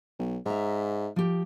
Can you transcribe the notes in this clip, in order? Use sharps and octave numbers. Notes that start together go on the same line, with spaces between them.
B1
G#2 E5 A#5
F3 G4